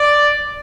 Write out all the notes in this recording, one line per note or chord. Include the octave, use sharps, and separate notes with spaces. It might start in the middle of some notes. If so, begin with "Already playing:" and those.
Already playing: D5